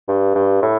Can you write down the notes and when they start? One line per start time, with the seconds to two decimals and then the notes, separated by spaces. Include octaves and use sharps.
0.08 G2
0.35 G2
0.62 A2